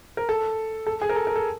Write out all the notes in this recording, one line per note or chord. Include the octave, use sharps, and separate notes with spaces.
A#4
A4
A4
G#4
A#4
A4
A#4
A4